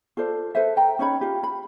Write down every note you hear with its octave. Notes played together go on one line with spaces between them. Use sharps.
F4 A4 C5 D5
A4 B4 C5 E5
A4 G5 A#5
C#4 D#4 C#5 B5
F4 G4
B5